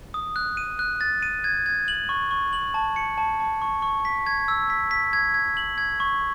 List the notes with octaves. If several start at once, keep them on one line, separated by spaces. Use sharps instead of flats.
D#6
F#6
D#7
F#6
A6
D#7
G#6
G#6
F#7
C#6
C#6
F#7
A5
C#7
A5
A5
C#6
C#6
B6
G#6
E6
B6
B6
G#6
G#6
F#7
G#6
C#6